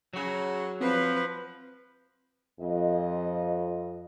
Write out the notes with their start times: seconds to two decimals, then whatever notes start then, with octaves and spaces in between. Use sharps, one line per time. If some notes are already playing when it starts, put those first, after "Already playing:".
0.13 C#3 F#3 C#4 F#4
0.81 F3 C4 B4
2.60 F2 D#5